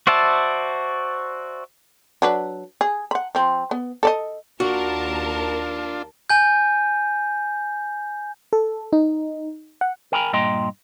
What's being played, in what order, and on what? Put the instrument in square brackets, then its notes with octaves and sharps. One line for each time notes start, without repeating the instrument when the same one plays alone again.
[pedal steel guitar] F#4 C5 D5 E5 A5
[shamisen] F#3 D4 B4
G#4
F#5 B5
F3 C4
B3
A4 D5 D#5
[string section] D#2 A#4 A5 [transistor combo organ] D4 F4 [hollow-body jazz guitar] F#4
[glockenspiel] G#5 G6
[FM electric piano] A4
D#4
F#5
[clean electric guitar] A#4 G5 G#5 A#5 B5
G2 A#2 D#5 G5 A#5 C6